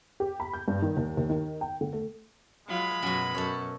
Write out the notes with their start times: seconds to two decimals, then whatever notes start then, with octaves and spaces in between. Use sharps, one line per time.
0.20 G4
0.40 B5
0.54 G6
0.68 G2
0.82 D#3
0.97 D#2
1.17 D#2
1.30 D#3
1.61 G5
1.81 D3
1.93 A3
2.68 F#3 G#3 F4 B5
3.02 F#2 B2 F#3
3.34 F#2 A4 C#5